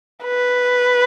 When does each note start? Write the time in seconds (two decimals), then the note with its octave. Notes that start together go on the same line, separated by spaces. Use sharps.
0.24 B4